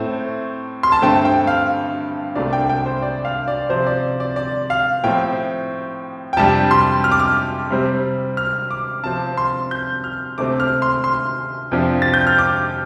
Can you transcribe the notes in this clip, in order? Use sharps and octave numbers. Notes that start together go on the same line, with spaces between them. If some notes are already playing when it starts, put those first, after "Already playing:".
Already playing: A2 A3 C4
C6
A5
G2 D3 A3 C4 G5
G5
F5
C2 C3 A3 D4 D5
G5
G5
C5
D5
F5
D5
C3 F3 C4 C5
D5
D5
D5
F5
A2 F3 C4 G5
G5
F2 C3 G3 D4 A5
C6
F6
D6
F6
C3 G3 C4
F6
D6
C3 F3 C4 A5
C6
G6
F6
D2 C3 A3 C4 D6
F6
C6
C6
F2 C3 F3 D4
A6
G6
F6
D6